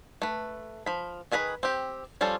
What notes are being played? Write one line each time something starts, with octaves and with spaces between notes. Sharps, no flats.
A3 B4
F3 B5
D#3 G#4 B4 A#5 B5
C4 G4
F3 G3 C#4 F4 A4